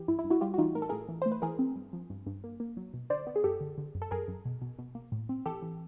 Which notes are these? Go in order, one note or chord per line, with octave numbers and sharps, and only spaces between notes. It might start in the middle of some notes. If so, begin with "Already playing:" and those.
Already playing: E3 G4
G2 E4
E4
G2
E4 F#4
G3 F4 G4
F#4
E3 D#4 F4
A2 A#4
A4
A2 G#4 A#4
E3
A3 C5
B4
E3 G#4 A#4
C4
G2
F3
G2
G2
A#3
A#3
F#3
B2
D3 C5 D5
B3
G#4
F#2 G4 A4
D3
D3
F#2
A4
F#2 G#4 A#4
F#2
B2
B2
B2
A#3
A2
C4
E3 G4 A4
E3